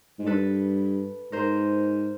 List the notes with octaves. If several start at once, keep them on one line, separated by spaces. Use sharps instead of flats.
G#2
G2 A4 B4
G#2 A#4 C5